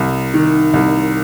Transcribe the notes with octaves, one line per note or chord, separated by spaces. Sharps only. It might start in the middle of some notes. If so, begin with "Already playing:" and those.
Already playing: C2
D#3
C2